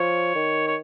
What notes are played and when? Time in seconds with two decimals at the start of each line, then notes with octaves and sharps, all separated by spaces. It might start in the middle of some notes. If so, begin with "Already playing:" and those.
Already playing: F3 C#5
0.35 D#3
0.68 C#5